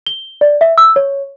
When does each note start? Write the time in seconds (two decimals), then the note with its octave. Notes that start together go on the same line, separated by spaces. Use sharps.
0.07 G7
0.41 D5
0.61 E5
0.78 E6
0.96 C#5